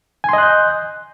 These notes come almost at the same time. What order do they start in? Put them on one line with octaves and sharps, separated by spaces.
G#5 C6 D#5 F#6 G6